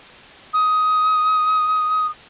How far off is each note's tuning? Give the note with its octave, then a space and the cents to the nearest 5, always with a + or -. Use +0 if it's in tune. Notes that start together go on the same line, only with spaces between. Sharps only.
D#6 +15